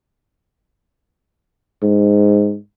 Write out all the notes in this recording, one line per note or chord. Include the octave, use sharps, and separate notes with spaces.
G#2